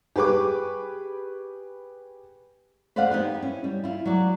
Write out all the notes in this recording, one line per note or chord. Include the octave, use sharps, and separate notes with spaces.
G4 G#4 B4 C#6 D6
B4 C5 D5 D#5 F5 F#5
B3 D#4 G4 B4
C#4 E4
G3
E4 F4
F#3 D5